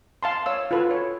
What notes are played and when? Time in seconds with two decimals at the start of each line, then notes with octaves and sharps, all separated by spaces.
0.23 F5 A5 C6
0.46 C#5 F5 E6
0.71 F4 F#4 A4 B4
0.91 C#5